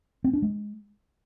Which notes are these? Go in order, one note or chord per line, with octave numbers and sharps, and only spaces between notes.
C4
D4
G#3